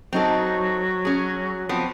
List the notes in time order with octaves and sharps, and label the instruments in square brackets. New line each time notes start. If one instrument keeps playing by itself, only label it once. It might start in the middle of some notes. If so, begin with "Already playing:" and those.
[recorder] F#3 [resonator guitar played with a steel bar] C4 D#4 A4
[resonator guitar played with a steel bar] C#4 G#4
F3 B3 C4